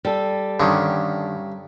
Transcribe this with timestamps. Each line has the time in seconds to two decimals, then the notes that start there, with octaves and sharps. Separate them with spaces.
0.05 G3 A4
0.60 G2 D3 D#3 C#4